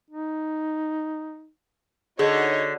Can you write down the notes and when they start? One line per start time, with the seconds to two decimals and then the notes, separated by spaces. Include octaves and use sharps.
0.10 D#4
2.19 D3 D#4 F#4 G#4 C#5 D#5